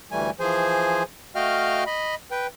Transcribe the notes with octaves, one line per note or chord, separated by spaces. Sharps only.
D2 E3 G3 A3 G#5
E3 F3 G#4 C5 G#5
A3 F#4 D#5 F5 G5 F6
D#5 B5
B4 G5